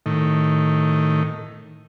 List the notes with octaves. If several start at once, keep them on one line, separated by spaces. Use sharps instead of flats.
A2 D#3